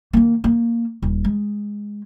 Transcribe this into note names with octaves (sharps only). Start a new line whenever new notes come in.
D#3 A#3
A#3
D#1
G#3